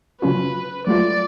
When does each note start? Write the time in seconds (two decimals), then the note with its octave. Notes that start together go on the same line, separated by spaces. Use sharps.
0.22 C#3 F#3 C#4 F4 B4
0.87 F#3 A3 F4 D5